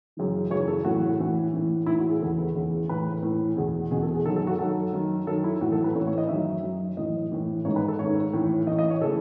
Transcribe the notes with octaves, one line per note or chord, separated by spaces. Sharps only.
F#2 C#3 E3
F#2 C#3 E3 C#5
A4
A2 E3 F#4
A2 E3
A2 E3
A2 E4
E3
F#4
G#4
E2 C#3 E3 A4
B4
E2 C#3 E3
A2 E3 B4
A2 E3
E2 B2 G#4
E2 B2 G#4
A4
G#4
F#2 D#3 A4
A4
F#4
F#2 D#3 A4
F#2 D#3
F#2 D#3 A4
E4
A2 E3 F#4
A4
B4
A2 E3 C#5
C#5
D#5
F#2 D#3 E5
F#2 D#3
A2 E3 D#5
A2 E3
G#2 D#3 C#5
B4
A4
G#2 D#3 C#5
A2 E3
A2 E3 D#5
D#5
C#5
C#3 E3 A4